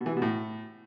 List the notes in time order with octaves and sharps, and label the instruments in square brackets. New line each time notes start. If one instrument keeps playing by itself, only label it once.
[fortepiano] B2
E3
C3
B2
A2